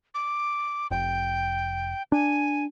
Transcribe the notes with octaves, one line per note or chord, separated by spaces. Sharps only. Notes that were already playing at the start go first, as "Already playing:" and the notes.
D6
F1 G5
D4 G#5